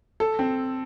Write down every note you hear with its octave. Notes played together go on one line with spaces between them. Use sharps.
A4
C4